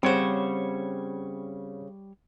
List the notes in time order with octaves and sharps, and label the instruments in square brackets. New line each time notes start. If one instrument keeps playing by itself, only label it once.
[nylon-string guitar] C#3 C5 [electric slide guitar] G3 C#5 [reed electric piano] C4 F#5